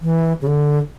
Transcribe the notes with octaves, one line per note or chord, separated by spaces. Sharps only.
E3
C#3
D3